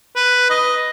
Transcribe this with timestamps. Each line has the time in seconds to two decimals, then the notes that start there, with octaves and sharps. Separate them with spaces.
0.16 B4
0.50 D#5